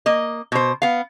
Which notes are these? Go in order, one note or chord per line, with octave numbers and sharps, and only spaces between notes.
A#3 D#5
B2 C5
B3 F5